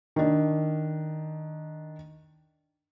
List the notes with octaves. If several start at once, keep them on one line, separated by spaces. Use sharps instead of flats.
D#3 D4